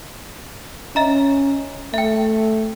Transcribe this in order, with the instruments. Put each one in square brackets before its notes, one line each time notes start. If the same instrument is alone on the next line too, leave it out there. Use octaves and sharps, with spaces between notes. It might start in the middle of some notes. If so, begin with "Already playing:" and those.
[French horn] C#4 [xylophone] D#5 E5 A#5
[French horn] A3 [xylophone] E5 G5